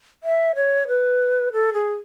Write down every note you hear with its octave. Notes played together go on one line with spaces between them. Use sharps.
E5
C#5
B4
A4
G#4